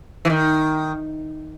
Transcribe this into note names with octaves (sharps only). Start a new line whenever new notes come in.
E3
D#3